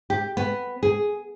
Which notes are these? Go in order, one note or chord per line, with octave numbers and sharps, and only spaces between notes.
G4
B3
G#4